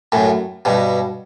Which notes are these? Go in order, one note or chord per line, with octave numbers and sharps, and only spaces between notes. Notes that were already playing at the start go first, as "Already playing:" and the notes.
F#2 A2
G2 B2